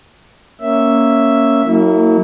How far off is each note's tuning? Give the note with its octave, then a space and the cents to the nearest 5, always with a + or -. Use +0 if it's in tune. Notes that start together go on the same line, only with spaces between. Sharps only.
A#3 +0 C#4 +0 E5 +0
F#3 +0 A#3 -35 E4 -35